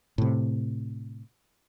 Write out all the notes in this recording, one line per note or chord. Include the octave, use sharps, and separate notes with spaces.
A2 C3